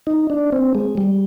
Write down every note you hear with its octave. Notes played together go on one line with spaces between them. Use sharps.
D#4
D4
C4
G#3
G3